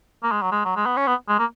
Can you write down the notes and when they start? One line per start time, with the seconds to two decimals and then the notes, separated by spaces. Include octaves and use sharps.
0.24 A#3
0.32 G#3
0.42 F#3
0.52 G#3
0.65 F#3
0.76 G#3
0.86 B3
0.97 C#4
1.07 B3
1.28 G#3
1.39 A#3